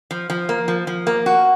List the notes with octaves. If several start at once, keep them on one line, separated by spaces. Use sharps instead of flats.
F3
F3
A#3
F3
F3
A#3
F#4